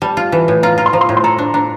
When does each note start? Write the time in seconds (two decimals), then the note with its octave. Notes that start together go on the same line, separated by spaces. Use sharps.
0.02 G3 A5
0.17 F4
0.32 E3
0.48 A2
0.63 F4 A#5
0.78 F4 A#5
0.86 C6
0.93 F3 A#5
1.01 C6
1.09 A2 A#5
1.17 C6
1.24 A4 A#5
1.38 D4
1.54 D4 A#5